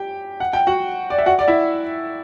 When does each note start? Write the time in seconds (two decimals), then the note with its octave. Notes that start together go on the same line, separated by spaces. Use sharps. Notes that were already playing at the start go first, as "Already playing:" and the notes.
Already playing: G4 G5
0.40 F#5
0.53 G5
0.67 F#4 F#5
1.10 D5
1.18 E5
1.26 F#4 F#5
1.39 D5
1.48 E4 E5